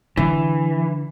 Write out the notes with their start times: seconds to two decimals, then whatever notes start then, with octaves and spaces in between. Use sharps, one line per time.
0.17 D3 E3